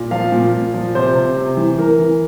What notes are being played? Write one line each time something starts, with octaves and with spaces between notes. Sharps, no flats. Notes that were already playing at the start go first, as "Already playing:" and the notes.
Already playing: A#2
F3 F5
A#2
A#2
F3
C3 C5
C3
C3
E3
E3 A#4
E3